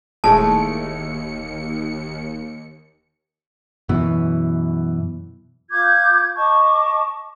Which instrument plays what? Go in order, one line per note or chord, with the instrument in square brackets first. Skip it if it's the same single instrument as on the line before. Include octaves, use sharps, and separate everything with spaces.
[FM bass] D#1 [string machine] D#2 C#7 [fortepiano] A2 G#3 A3 [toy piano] A5
[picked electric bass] F#2 B2 E3
[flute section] F4 D6 G6 G#6
D#5 A5 C#6 D6